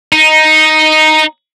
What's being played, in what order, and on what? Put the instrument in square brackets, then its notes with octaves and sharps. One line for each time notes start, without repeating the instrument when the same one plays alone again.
[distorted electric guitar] D#4